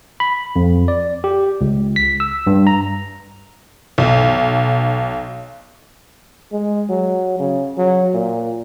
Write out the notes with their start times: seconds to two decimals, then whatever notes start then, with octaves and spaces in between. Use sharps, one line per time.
0.20 B5
0.56 F2
0.88 D5
1.24 G4
1.61 C#2
1.96 B6
2.20 E6
2.47 G2
2.67 A#5
3.98 B1
6.52 G#3
6.90 F#3
7.39 C#3
7.77 F#3
8.14 A#2